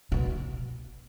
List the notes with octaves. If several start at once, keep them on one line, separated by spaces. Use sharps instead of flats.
B2